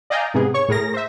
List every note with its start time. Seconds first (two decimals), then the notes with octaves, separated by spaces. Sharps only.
0.10 D5 D#5 F5 G5 G#5 A#5
0.34 G#2 C3 B3 G#4
0.54 C#5 C#6
0.68 A2 G#4 A#4 A#6
0.94 C5 E5